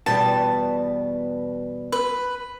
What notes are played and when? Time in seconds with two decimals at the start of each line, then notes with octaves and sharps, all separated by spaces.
0.06 E2 B2 G3 A5
1.92 B4